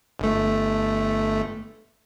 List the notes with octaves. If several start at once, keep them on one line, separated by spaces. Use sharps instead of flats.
G1 A3